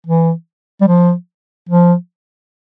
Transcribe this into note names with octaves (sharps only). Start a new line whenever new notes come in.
E3
G3
F3
F3